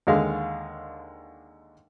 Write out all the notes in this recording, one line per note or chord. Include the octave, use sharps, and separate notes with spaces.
D#2 D3 G#3 F5